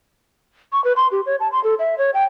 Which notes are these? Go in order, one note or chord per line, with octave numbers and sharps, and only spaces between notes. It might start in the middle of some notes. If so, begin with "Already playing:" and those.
C#6
B4
C6
G4
C#5
A5
C6
A4
E5
C#5
G5